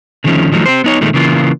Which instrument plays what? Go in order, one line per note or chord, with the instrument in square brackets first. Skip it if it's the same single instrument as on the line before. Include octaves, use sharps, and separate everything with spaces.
[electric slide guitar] D3 D#3 F3 A3 C#4
D#3 F3 F#3 A3
C4 G4 C5
B3 D#4 C#5
A#2 D#3 G#3 A3
C#3 E3 A#3 F4